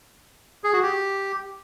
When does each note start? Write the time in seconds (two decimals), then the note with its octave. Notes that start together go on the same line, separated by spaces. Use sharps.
0.64 G#4
0.73 F#4
0.82 G4